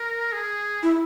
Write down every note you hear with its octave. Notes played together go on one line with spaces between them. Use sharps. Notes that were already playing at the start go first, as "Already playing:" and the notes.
Already playing: A#4
G#4
E4